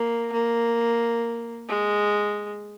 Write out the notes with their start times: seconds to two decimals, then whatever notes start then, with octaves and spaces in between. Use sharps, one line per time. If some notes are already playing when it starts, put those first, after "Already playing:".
Already playing: A#3
0.33 A#3
1.67 G#3